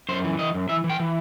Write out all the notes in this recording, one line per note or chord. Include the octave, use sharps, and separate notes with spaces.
F#2 C5
E3
E3 D#5
F#2
E3 E5
E3
G5
E3